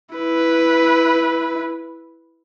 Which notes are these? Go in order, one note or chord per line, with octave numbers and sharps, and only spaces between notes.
E4 B4